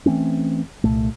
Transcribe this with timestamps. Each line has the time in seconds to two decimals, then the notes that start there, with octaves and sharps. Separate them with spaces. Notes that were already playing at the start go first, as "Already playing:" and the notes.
0.06 E3 A3 C4 C#4
0.84 C2 A#2 A3